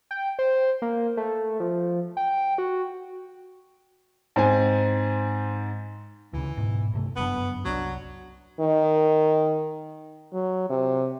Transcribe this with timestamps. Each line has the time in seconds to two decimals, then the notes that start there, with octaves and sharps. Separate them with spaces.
0.11 G5
0.39 C5
0.82 A#3
1.17 A3
1.60 F3
2.17 G5
2.58 F#4
4.36 G#2 C4 G#5
6.33 D2 C#3 E3
6.57 G#2 B2
6.93 G2 C3 A3
7.16 G1 F#2 B3 D4
7.65 C2 F#3 C#4 D4
8.60 D#3
10.33 F#3
10.70 C3